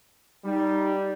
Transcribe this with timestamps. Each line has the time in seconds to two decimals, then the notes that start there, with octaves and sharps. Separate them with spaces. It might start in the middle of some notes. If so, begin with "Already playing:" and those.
0.45 G3 D#4